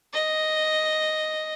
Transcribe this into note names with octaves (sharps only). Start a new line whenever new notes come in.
D#5